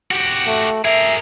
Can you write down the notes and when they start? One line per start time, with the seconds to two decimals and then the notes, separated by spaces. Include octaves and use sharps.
0.11 F#4 G4
0.47 A3
0.85 G#4 A#4 E5